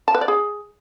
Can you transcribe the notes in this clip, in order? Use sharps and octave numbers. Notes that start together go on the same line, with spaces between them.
A5
B4
D5
G#4